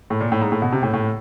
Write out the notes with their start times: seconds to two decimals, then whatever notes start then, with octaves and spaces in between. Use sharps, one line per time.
0.10 A2
0.21 A#2
0.32 A2
0.41 G#2
0.52 A2
0.62 B2
0.72 C3
0.83 A2
0.93 A2